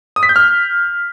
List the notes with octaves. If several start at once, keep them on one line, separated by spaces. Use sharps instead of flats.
D#6
B6
G6
F6